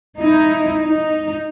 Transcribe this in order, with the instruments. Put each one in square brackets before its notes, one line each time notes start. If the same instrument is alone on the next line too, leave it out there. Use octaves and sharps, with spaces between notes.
[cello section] D#4 E4
D#4